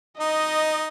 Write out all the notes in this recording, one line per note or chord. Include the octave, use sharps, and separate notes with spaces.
D#4 D#5